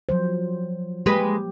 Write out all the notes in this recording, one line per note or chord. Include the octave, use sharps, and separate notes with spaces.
F3 F#3 C5
G3 G#3 A#3 G4 B4